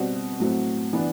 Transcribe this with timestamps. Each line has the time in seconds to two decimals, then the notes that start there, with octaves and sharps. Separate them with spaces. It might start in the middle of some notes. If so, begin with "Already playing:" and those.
Already playing: B2 G3 C4 F#4
0.40 A2 F#3 C4
0.93 E3 B3 D4